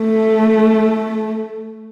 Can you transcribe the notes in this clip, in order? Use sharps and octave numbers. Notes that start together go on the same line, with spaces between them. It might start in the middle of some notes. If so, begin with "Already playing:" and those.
Already playing: A3